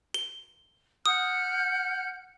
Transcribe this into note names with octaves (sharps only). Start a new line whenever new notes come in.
G7
F#5 D#6 F6 G6